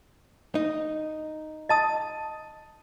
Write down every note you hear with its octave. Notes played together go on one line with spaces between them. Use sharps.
D#4
D#5 A5 D#6